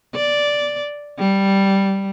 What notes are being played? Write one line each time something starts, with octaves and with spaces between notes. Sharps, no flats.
D5
G3